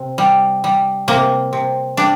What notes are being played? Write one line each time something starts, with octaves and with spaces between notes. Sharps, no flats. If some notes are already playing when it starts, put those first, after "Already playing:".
Already playing: C3
G3
G3
C3 A#3
C3
G3 D4